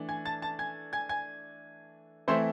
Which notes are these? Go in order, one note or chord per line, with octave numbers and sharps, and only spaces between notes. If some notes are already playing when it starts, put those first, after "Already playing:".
Already playing: E3 A3 D4
G#5 G#6
A5 A6
A5 A6
G#5 G#6
G#5 G#6
G#5 G#6
E3 A3 C4 E4 C5 C6